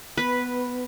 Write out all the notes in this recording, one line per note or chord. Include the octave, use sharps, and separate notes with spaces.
B3 B4